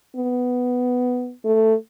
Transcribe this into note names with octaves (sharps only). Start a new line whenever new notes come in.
B3
A3